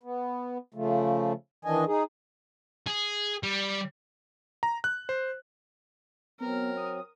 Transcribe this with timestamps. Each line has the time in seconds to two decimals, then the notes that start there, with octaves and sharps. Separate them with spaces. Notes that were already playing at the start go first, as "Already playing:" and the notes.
0.03 B3
0.74 C#3 F3 A3
1.65 D#3 E3 D4 D#5 G#5
1.87 D#4 G#4
2.87 G#4
3.43 G3
4.63 A#5
4.84 F#6
5.09 C5
6.40 F#3 B3 C4 A#4
6.77 D#6